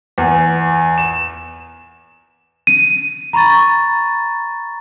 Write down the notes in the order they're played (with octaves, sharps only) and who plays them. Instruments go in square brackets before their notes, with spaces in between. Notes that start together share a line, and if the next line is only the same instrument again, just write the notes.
[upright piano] E2
E7
[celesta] D#7
A#5 B5 C#6 A6